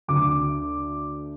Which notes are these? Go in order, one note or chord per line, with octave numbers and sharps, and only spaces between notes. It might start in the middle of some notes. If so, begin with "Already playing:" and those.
D2 D3 D6